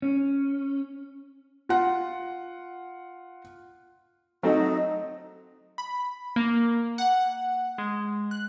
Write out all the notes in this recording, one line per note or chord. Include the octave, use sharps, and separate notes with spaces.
C#4
F4 F#5
F#3 A3 C4 D#4
B5
A#3
F#5
G#3
F#6